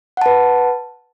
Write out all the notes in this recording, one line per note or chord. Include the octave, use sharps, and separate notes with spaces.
B4 F#5 A5